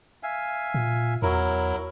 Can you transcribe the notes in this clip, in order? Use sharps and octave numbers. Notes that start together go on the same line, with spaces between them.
E5 F5 G#5
A#2
E2 F#3 E4 A#4